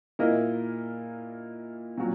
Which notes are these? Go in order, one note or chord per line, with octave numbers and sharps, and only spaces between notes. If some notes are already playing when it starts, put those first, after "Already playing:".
A#2 A#3 E4 A#4 D#5
A#2 F#3